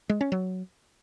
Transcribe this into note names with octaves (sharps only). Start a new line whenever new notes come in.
G#3
C#4
F#3